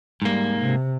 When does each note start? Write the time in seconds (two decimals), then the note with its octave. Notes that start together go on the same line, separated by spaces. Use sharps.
0.22 G#2 G3 A#3
0.61 C3